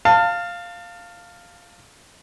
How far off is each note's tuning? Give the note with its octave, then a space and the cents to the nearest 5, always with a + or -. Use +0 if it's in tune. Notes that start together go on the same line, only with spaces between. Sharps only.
F5 +0 A5 +30